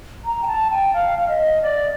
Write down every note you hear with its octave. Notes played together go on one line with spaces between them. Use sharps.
A#5
G5
A5
G5
F5
F5
D#5
D5